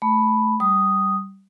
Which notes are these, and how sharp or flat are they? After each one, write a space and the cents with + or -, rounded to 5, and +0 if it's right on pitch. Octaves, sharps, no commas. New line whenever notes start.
A3 -15 B5 +0
G3 -20 D#6 +0